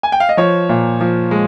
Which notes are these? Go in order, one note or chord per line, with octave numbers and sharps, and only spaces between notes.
G#5
G5
F5
D#5
F3 C#5
A#2
F3
G#3